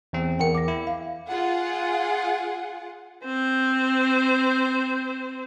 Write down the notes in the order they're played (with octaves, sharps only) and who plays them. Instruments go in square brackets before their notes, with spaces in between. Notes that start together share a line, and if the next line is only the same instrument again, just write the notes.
[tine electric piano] E2 C4
[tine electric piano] E2 C#7 [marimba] A#4 F#5 G5
[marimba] D6 A#6
[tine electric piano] E4
[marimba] F5
[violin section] F4 G#4 F#5
[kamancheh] C4 C5